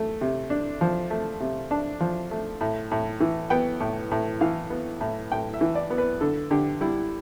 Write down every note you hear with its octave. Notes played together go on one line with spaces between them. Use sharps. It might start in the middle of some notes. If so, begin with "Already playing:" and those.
Already playing: A3
C3
D4
F3
A3
C3
D4 A5
F3
A3
A2
A2
E3
B3 G5
A2
A2
E3 F5
B3
A2
A2 G5
E5
E3
D5
B3
B4
D3 A4
D3 G4
G3 E4